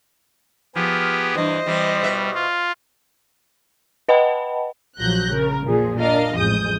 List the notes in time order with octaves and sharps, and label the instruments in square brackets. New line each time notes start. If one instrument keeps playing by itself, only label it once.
[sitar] F3 [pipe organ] B3 G4 G#4
[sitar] G2 E3 [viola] C5 D#5
[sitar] E3 C4 [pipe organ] G3
[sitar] B2 B4 E5
[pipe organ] F4
[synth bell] B4 D#5 F#5 G5 A5 B5
[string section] A#1 F3 F#3 F#6 G6 A#6
C#3 A#4
A#2 F3 G#4
D4 A#4 D#5 F5
A1 F2 G#3 D#6 G6